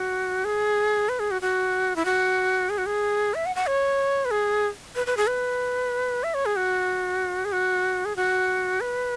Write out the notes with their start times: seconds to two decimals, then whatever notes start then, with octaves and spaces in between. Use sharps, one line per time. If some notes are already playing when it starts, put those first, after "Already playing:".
Already playing: F#4
0.45 G#4
1.09 B4
1.20 G#4
1.31 F#4
1.42 F#4
1.96 E4
2.05 F#4
2.70 G#4
2.78 F#4
2.86 G#4
3.34 E5
3.46 F#5
3.56 F#5
3.67 C#5
4.25 B4
4.32 G#4
4.96 B4
5.06 B4
5.17 G#4
5.28 B4
6.24 E5
6.34 C#5
6.46 G#4
6.56 F#4
7.45 G#4
7.52 F#4
8.05 G#4
8.16 F#4
8.81 B4